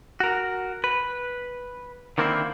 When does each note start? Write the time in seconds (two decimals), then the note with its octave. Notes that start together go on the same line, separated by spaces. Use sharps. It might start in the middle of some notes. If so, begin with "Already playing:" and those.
0.20 F#4 A#4
0.84 B4
2.18 D3 D#3 A#3 C4 E4